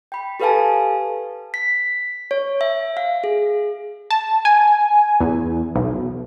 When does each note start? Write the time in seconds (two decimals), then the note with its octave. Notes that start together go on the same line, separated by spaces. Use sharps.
0.12 G5 B5
0.40 G4 A4 B4 F5 G#5 A5
1.54 B6
2.31 C#5
2.61 E5
2.97 F5
3.24 G#4
4.11 A5
4.45 G#5
5.21 E2
5.76 B1